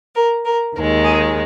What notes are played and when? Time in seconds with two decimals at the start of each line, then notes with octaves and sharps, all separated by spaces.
0.15 A#4
0.45 A#4
0.75 D#2 D#3 G#3 A#4
1.04 G#4